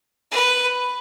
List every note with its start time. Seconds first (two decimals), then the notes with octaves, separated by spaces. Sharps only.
0.31 B4